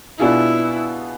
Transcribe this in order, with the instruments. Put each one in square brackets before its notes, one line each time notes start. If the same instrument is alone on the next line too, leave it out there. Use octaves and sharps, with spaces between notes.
[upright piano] B2 B3 D4 F4 G#4 [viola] E4